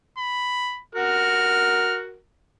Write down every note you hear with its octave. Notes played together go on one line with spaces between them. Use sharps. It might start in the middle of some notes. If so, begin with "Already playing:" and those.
B5
F#4 A#4 F6